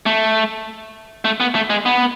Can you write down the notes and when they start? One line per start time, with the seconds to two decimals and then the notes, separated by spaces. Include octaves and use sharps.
0.06 A3
1.25 A3
1.40 B3
1.55 A3
1.70 G#3
1.86 B3